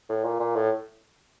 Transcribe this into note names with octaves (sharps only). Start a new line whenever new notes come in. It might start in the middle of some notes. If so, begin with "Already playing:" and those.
A2
A#2
A#2
A2